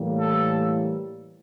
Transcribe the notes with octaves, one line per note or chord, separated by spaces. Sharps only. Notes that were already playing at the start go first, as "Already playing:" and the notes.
Already playing: A2 E3 G3 A#3
A4